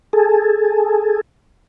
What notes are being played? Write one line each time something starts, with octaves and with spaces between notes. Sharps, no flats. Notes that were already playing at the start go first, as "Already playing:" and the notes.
G#4 A4